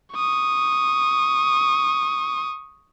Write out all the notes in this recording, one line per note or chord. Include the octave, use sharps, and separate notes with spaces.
C#6 D#6